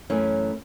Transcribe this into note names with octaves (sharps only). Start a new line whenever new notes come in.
F#2 E3 A3 C#4